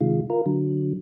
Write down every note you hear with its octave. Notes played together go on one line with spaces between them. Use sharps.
C3 D#3 G#3 F4
F4 A#4
D3 F#3